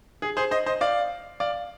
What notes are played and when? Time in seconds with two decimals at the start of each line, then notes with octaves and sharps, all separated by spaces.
0.22 G#4
0.37 G#4 C5
0.51 C5 D#5
0.66 C5 D#5
0.81 D5 F5
1.40 D5 F5